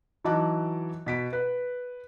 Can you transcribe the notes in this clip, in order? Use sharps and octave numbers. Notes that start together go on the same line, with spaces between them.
E3 F#3 D#4 A5 D6 F#6
B2 B6 D7
B4